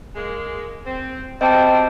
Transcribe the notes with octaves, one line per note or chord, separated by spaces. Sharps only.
G#3 A#3
C4
B2 G3 C4 D#5 G5 A5